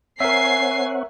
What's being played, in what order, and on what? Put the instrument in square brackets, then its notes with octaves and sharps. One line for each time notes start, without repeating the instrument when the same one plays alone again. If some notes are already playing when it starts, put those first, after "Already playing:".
[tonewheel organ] C4 C#5 F#5 [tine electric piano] A#4 E5 [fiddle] G#5 [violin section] C7